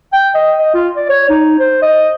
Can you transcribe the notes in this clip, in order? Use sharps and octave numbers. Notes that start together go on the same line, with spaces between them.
G5
D#5
D#5
F4
D5
C#5
D#4
C5
D#5